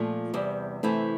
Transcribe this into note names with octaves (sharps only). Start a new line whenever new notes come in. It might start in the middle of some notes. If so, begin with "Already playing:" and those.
Already playing: A#2 F3 A3
E2 C3 G3
C3 E3 A3 C4 E4